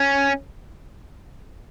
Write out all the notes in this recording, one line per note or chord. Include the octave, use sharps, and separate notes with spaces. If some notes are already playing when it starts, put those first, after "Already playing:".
Already playing: C#4